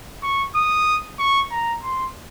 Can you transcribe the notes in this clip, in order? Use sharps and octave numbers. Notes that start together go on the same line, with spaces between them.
C#6
D#6
C#6
A#5
C6